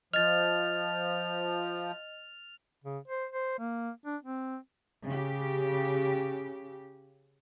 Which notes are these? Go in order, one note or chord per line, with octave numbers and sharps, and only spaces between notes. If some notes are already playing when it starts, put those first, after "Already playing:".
F3 D#5 F6 A6 F7
C#3
C5
C5
A#3
D4
C4
C#3 G4